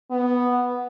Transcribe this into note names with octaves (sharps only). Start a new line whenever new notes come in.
B3